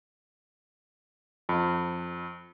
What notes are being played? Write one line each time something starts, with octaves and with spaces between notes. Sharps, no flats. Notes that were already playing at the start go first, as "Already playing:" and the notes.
F2